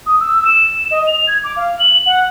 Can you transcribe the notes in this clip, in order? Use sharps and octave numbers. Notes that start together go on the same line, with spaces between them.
D#6
E6
E7
D#5
F7
G#6
D6
F5
F#7
F#5